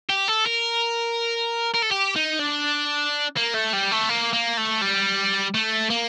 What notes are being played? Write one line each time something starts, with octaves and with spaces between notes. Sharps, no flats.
G4
A4
A#4
A#4
A4
G4
D#4
D4
A#3
A3
G3
A3
A#3
A#3
A3
G3
A3
A#3